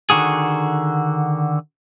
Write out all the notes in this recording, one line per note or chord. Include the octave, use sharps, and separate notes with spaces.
D3 D#3 F#4 G#4